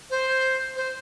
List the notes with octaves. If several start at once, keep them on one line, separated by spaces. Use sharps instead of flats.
C5
C5